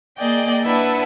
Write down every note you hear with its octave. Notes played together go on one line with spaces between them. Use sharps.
A#3 G#4 D5 D#5 G5
D4 E4 B4 E5 F#5 A5